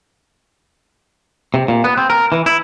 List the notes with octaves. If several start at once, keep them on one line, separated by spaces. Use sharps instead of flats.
C3
A#2
B3
C4
A#4
E3
E4